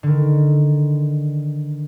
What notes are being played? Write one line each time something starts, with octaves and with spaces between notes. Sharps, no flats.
D3 D#3